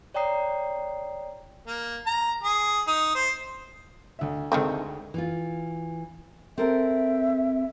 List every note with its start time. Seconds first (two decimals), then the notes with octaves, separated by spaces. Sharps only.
0.14 C#5 D5 G5 A#5 D#6 C7
1.67 A#3
2.06 A#5
2.44 G#4
2.87 D#4
3.15 C5
4.19 D2 E5
4.52 D2 D#3 G#3 A3 C4 D#5
5.14 E3 F4
6.58 C4 A4 A#4 E5